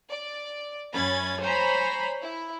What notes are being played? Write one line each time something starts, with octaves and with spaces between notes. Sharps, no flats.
D5
F#2 C#4 B5 G#6 A6
C5 C#5 G#5 A#5 B5
E4